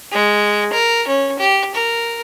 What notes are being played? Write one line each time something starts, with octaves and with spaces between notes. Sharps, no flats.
G#3
A#4
C#4
G4
A#4